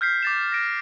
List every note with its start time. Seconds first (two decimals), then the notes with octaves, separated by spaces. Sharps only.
0.01 F6 G6 B6 C7
0.23 D6 A6 E7
0.52 A#6 D7